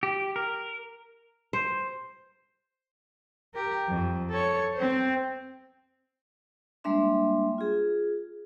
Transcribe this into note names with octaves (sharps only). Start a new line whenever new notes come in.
G4
A#4
C5
G4 A#4
F2
A4 C#5
C4 C5
G3 G#3 A#3 D4 E5 C6
F4 G#4